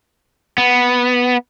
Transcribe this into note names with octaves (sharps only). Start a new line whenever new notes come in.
B3